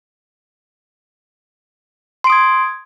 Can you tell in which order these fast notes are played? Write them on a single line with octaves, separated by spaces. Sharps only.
C6 D7 D#6 G#6